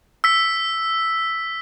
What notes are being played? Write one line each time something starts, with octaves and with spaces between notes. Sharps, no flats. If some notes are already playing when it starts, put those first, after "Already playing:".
E6 B6